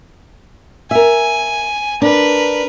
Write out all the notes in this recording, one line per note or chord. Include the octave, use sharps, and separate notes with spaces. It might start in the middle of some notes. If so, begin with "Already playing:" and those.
A#4 E5 G#5
D4 A#4 B4